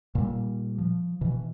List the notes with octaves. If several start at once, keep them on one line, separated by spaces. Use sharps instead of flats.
A#2 G3
F3
B2 E3